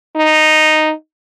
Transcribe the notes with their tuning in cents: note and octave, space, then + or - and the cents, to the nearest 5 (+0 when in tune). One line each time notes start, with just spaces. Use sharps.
D#4 -5